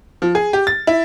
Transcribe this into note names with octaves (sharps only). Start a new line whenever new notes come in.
F3
G#4
G4
A6
E4